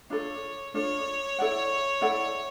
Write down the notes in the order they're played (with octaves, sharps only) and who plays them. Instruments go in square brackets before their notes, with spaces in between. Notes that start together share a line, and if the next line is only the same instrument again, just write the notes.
[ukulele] D4 F4 A4 [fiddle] C#5
[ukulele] D4 F4 A4 [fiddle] C#5
[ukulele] E4 A4 D5 F#5
E4 A4 D5 F#5